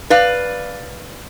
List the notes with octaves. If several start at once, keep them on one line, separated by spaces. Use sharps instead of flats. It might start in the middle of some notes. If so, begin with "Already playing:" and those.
B4 D5 F5